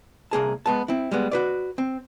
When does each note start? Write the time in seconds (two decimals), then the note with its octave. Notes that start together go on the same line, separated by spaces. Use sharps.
0.31 C2 A#3 G#4 A5
0.66 G#3 B3 A5
0.88 C4 E4
1.11 G3 G#3 B3
1.31 F#4 B4 D5
1.78 C4